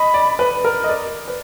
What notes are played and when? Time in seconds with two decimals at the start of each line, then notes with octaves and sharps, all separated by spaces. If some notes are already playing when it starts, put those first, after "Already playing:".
Already playing: D#5 B5
0.14 D5
0.39 B4
0.65 A#4
0.84 D#5
0.89 D5
1.28 B4